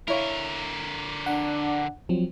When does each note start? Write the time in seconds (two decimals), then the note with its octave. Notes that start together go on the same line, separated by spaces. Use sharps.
0.08 D3 E4 A#4 C#5 F5
1.26 D4 F#5
2.09 F3 F#3 C4